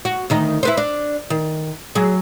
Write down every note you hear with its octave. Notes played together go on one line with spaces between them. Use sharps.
F#4
D2 D#3 D#4
E4 B4 C5
D4
D#3
F#3 G#4